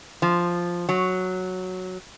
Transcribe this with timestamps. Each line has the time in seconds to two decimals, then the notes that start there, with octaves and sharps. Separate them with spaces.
0.22 F3
0.89 F#3